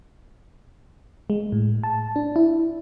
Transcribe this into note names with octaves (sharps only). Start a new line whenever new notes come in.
G#3
A2
A5
D4
E4